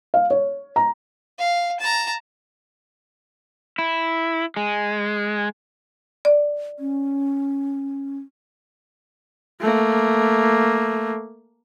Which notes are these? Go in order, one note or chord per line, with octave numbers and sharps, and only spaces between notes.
F5
C#5
A#5
F5
A5 A#5
E4
G#3
D5
C#4
A3 A#3